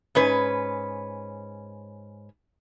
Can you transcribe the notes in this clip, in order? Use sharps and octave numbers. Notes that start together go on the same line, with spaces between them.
G#2 C#4 B4